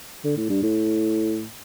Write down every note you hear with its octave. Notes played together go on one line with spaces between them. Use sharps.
D3
A2
G2
A2